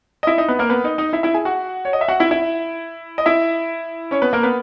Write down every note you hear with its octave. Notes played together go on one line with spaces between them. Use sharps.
D#5
E4 E5
D#4 D#5
B3 B4
A#3 A#4
B3 B4
D#4 D#5
D#4 D#5
E4 E5
E4 E5
G#4 G#5
F#4 F#5
C#5
D#5
E5
F#4 F#5
E4 E5
E4 E5
D#5
E4 E5
C#4 C#5
B3 B4
A#3 A#4
B3 B4